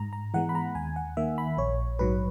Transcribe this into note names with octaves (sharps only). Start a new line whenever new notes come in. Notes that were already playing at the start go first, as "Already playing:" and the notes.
Already playing: G#2 A#5
A#5
E3 G#3 B3 F#5
B5
A#5
D#2 G#5
F#5
D#3 A#3 E5
B5
A#1 C#5
G#2 F#3 B4